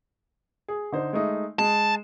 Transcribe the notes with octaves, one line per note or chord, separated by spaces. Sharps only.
G#4
D3 D#4 C5
G#3 A3 D#4
G#3 A5